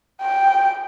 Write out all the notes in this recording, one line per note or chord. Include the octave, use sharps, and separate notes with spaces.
G5